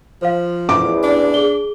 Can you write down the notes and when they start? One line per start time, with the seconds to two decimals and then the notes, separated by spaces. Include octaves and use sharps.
0.22 F3 C5 F5
0.69 A1 E2 D6
1.03 D4
1.34 G#4 G7